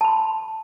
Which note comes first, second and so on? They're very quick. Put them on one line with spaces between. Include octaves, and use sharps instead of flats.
A5 B5 C6